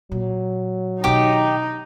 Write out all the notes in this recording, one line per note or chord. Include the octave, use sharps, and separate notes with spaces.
A#2 F#3
B2 D#3 D#4 G4 D6